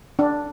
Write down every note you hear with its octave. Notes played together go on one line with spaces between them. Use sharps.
D4